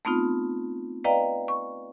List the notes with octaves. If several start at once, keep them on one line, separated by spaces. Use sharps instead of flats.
A3 B3 C4 D#4 F4
B4 D5 D#5 F5 G5 A#5
C#6